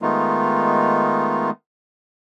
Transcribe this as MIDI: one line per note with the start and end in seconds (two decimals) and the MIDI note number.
0.02 1.50 51
0.02 1.50 56
0.02 1.50 57
0.02 1.50 59
0.02 1.50 63
0.02 1.50 65